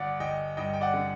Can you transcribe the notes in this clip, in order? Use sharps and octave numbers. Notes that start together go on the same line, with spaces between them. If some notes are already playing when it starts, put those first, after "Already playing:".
Already playing: G1 D5 F#5
G1 D#5 G5
G2 D#5 G5
G5
D5 F#5
D3